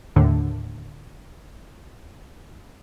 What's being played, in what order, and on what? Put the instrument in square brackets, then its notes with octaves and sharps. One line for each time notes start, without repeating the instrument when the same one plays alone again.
[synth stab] D#2 A2 D3